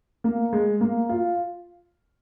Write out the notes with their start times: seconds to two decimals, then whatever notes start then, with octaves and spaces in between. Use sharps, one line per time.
0.24 A#3
0.53 G#3
0.81 A#3
1.09 F4